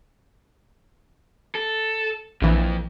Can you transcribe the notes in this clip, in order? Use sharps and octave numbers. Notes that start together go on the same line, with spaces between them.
A4
A#1 F2 E3